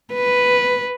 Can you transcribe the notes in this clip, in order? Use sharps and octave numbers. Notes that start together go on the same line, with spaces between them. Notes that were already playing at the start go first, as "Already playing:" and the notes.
B4